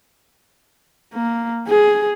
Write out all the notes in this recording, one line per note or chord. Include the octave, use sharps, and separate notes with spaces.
A#3
G#4